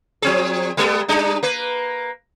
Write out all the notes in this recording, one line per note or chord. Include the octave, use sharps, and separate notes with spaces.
F3 C4 G#4
G3 G#3 B3
G3 D4 D#4
A#3 B4